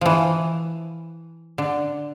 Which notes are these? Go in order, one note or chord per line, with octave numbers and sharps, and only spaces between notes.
E3 F3
D3